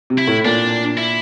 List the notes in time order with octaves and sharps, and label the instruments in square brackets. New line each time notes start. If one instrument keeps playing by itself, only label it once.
[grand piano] C3
[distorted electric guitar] E4
[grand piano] A2
[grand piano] A#2 [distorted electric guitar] D4
[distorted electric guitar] E4